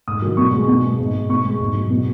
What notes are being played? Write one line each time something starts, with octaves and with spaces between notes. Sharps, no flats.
G#2 D#6
D#3 F#3
B2 C#6
G#3
B2
G#3
G#2
G#3
B2 C#6
G#3
G#2
F#3
B2